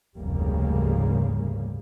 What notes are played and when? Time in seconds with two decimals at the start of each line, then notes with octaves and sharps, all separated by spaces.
0.18 F1 D2 G#2 C#3 G3 A#3